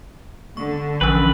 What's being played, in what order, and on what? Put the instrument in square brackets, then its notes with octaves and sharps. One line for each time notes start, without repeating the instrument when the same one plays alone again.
[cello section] D3 [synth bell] C#6
[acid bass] A1 [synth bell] E3 F3 C#4 [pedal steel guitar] B4